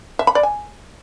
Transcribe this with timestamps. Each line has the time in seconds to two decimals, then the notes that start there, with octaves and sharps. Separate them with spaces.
0.19 E5
0.27 B5
0.35 D5
0.43 G#5